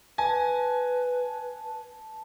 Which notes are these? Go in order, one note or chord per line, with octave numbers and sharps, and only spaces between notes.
B4 G#5 A5